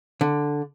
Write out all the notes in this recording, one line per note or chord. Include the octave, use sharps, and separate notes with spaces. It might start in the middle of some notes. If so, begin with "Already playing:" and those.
D3